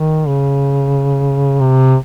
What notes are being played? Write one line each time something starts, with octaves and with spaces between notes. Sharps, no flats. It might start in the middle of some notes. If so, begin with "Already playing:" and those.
Already playing: D#3
C#3
C3